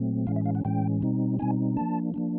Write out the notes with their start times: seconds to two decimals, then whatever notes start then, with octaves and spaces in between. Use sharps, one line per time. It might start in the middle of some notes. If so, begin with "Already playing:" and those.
Already playing: A#2 F#3 A3 C4
0.27 A2 E3 G#3 C#4 F5
0.36 E5
0.45 F5
0.55 F#5
0.65 A2 E3 G#3 C#4 G5
1.01 B2 G3 C4 D#4
1.39 B2 G3 C4 D#4 G#5
1.77 F3 A#3 D4 A5
2.14 F3 A#3 D4